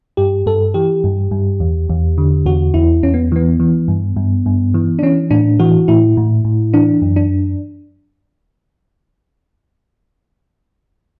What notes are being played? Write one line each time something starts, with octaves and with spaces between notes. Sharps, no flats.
G2 G4
G2 A4
E3 G4
G2
G2
E2
E2
D3
E2 F#4
E2 E4
E2 C#4
B3
E3 B3
E3
G2
G2
G2
E3
D4
E3 C#4
A2 D4
E3 F#4
A2 E4
A2
A2
E3 D4
F#2
D4